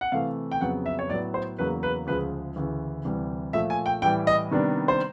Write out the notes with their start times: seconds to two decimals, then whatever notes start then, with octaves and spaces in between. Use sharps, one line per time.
0.01 F#5
0.12 C3 E3 A3 F5
0.52 G5
0.61 F2 C#3 F#3 B3 F#5
0.86 E5
0.99 C#5
1.10 A2 F#3 B3 D5
1.34 C5
1.59 E2 C#3 F#3 A#3 B4
1.83 B4
2.07 D2 C#3 F3 G#3 B4
2.56 D2 C#3 E3
3.05 D2 C3 E3 G3
3.53 A#2 F3 A3 E5
3.70 G#5
3.86 G5
4.02 A2 E3 G3 G5
4.27 D#5
4.51 C3 D#3 G3 B3 D4
4.88 C5